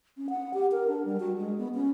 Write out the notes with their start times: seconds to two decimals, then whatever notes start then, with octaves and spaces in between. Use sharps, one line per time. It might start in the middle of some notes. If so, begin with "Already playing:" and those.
0.17 C#4
0.30 F#5
0.54 G4
0.72 A#4
0.88 D4
1.05 G3
1.20 F#4
1.38 G#3
1.58 B3
1.74 C#4